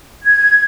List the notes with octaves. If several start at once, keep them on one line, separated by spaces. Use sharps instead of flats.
G#6